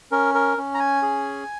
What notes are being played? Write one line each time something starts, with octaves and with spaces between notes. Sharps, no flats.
C#4 A#4
A#4
C#4
A#5
G#5
G#4